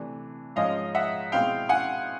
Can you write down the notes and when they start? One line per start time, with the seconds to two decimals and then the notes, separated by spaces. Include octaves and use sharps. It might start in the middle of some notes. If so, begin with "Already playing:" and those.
Already playing: C3 E3 A3 D4
0.56 G#2 F3 G#3 C#4 D#5 F5
0.95 E5 F#5
1.32 B2 G#3 C4 E4 F5 G5
1.69 F#5 G#5